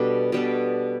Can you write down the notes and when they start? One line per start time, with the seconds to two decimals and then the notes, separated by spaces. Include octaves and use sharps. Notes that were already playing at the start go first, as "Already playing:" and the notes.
Already playing: B2 G3 D4 A4
0.32 B2 G3 D4 A4